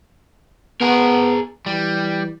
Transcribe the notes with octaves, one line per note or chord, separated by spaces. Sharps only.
B3 G#4 A#4
E3 G3